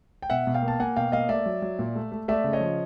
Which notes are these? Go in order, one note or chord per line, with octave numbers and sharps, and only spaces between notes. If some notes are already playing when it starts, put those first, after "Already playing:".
G5
B2 E5 F#5
B2
F5 G5
A#3
A5
A#3 F#5 G#5
B2 F5 G5
A#3 D#5 F5
A3 D5 E5
F#3
F#3
A#2
A3
A3
A3 D5 E5
C#3
C#5 D#5
F3